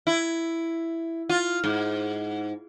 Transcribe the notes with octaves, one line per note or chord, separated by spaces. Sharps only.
E4
F4
G#2